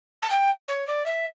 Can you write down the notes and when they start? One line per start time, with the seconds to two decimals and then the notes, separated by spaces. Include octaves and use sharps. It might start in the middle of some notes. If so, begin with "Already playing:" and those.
0.22 A5
0.30 G5
0.68 C#5
0.87 D5
1.05 E5